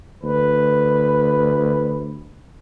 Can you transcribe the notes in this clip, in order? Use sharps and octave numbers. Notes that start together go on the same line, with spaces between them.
D2 B4